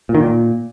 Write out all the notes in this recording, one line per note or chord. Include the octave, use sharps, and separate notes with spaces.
A#2
D#3
A#2